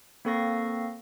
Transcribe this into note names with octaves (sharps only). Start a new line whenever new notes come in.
A#3 C4 A4 F5 C#6 A#6